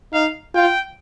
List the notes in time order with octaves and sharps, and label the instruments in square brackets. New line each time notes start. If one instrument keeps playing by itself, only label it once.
[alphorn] D#4 [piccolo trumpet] F5
[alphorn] F4 [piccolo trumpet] G5